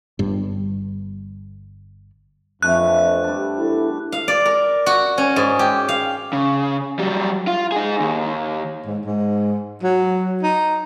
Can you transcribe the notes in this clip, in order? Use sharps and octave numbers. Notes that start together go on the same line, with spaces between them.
G1 G2
F2 D3 E3 A3 F#6
G3 D4
E2 E4 A4
F5
D5
A#4
F#4
C#4
G#2
G4
F5
C#3
F#3 G3
F4
D#4 G#4
D#2
G#2
G#2
F#3
D#4